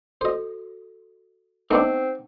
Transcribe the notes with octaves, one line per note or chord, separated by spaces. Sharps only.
F#4 A4 C5 D#5
A3 B3 C4 D4 D#4 F#5 C#6 E6